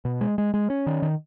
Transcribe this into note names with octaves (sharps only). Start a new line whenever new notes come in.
B2
G#3
G#3
G#3
C#4
D#3
D#3